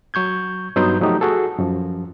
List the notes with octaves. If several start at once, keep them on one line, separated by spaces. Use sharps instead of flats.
F#3 C#6 G6 G#6
G2 F#3 B3 D#4 C6 G6
F3 F#3 A3 D#4 F#4 G4
F#4 G#4 A4
F#2 F3